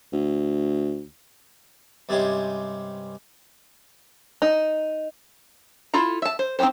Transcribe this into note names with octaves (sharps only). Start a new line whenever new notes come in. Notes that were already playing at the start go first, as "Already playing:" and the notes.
D2
G2 C3 G#3 C#4 G4 C6
D#4
E4 F4 A4 A#5
E5 A5
C5
C4 D#4 F#4 G4 C5